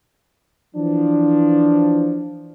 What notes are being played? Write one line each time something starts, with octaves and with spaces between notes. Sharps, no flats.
E3 F3 D4